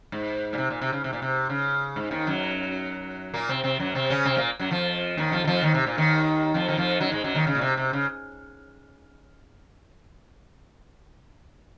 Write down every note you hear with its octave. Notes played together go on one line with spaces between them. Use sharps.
G#2
A#2
C3
A#2
C3
C#3
C3
A#2
C3
C#3
G#2
D#2 D#3
F#2 F#3
A#2 A#3
C3 C4
C3 C4
F#2 F#3
C3 C4
C#3 C#4
C3 C4
A#2 A#3
F#2 F#3
F2 F3
D#2 D#3
F2 F3
D#3
F2 F3
D#2 D#3
C3
A#2
D#2 D#3
F2 F3
D#3
F2 F3
F#2 F#3
G#2 G#3
F#2 F#3
D#2 D#3
C#3
A#2
C3
C3
C#3